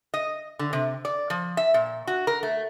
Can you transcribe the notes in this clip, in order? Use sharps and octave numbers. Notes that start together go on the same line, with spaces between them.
D#5
D3
C3
D5
F3
E5
A#2
F#4
A#4
A3